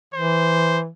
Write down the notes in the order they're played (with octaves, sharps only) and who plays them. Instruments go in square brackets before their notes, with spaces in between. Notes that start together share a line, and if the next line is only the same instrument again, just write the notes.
[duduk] E3 [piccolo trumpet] C5